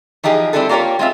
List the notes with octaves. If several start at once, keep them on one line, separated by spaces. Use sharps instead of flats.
E3 F3 D#4 G4 G#4
G3 C4 D4 E4 G#4 A4
A#3 F4 G4 A#4 C#5
G#3 C4 F4 E5